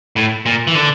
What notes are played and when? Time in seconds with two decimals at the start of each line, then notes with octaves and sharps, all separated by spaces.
0.16 A2
0.46 A#2
0.67 E3
0.75 D3